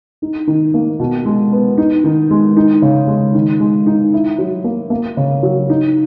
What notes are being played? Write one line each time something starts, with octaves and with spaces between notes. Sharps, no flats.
D#4
D#3
A#3
B2
G#3
B3
D#4
D#3
G#3
D#4
C#3
G#3
D#3
G#3
D#4
E4
F#3
A#3
A#3
C#3
F#3
D#4